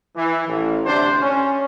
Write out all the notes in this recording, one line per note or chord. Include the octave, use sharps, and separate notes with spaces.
E3
A1
D2 C3 D4 C5
C#4